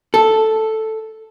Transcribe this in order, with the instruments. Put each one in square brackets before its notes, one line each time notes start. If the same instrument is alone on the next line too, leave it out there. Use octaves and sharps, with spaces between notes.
[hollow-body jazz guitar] A4